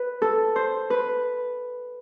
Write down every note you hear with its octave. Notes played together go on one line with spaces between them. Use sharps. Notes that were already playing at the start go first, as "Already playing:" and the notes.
Already playing: B4
A4
C5
B4